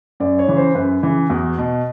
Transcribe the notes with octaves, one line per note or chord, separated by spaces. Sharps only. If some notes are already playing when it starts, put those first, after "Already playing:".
F#2 D5
C#5
C#3 E3
C5
F#2 B4
C#3 E3
E2 F#4
B2